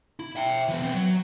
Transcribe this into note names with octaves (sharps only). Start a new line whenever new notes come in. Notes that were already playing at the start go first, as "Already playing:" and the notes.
E4
E5 G5
B2 E3
B3 C4
F#3